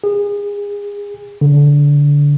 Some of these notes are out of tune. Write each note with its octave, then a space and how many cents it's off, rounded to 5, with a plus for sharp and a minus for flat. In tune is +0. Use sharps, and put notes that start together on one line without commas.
G#4 -30
D3 -20